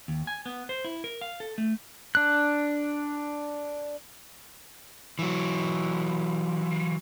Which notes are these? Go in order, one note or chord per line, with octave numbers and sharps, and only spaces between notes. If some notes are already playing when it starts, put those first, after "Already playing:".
D#2
G#5
B3
C5
E4
A#4
F5
A4
A3
D4 F#6
E3 F#3